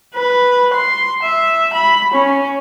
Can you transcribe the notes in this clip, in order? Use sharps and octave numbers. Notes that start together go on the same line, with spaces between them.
B4
C6
E5
B5
C#4